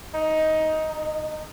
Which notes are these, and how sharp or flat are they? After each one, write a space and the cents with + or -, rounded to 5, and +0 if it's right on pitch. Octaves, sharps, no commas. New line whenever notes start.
D#4 +10
D#4 -20